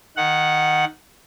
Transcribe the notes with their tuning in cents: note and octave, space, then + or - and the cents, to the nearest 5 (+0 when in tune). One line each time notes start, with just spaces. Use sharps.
D#3 +0 F#5 +0